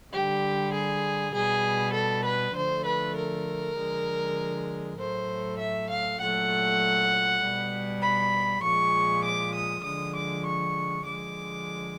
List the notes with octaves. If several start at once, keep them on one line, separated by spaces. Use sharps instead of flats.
D3 G3 G4
G#4
B2 G3 G#4
A4
B4
D3 F3 A3 C5
B4
A#4
D3 F3 G#3
A2 F#3 A3 C5
E5
F5
A#2 F#3 A3 F#5
B2 G3
B5
A#2 F3 G#3 C#6
D6
D#6
D3 F3 G#3 D#6
D6
C#6
D3 F3 G#3 D6